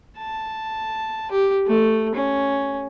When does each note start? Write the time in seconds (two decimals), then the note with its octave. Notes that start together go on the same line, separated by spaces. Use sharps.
0.18 A5
1.31 G4
1.66 A3
2.15 C#4